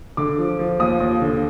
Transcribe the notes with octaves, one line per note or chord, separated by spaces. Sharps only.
D3 D6
F3
F3
D#2 D#6
D#2
D3